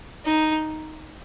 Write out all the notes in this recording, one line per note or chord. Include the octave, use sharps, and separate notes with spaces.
D#4